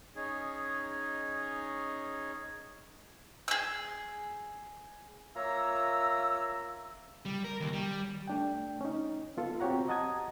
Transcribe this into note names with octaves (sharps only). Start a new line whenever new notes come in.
C#4 D#4 G#4
G#4 E6
A#3 F4 C#5 E5 A#5 E6
G3
A#4
D#2
G3
A3 D4 G5
C#4 D#4
B3 F4 A4
C4 F#4 G4 C#5 F#5 A#5
D#5 F#5 A5 A#5 D#6 G#6